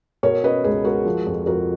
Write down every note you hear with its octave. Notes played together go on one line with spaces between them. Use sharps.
B2 A#4 C#5
C#4 B4 D#5
C#2 G#4 B4
G#3 F#4 A#4
F3
F2
F2 F#4 A#4